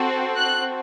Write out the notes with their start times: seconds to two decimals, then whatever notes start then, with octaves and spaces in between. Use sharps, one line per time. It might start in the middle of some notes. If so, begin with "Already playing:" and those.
Already playing: C4 F#4 A4
0.36 F#6